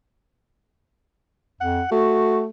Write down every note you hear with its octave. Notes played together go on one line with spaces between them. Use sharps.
F2 F#5
A3 F#4